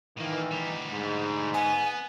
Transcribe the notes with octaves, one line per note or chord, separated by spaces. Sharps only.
A2 D#3 E3 A#3
D2 G3
G#2
B3 G#5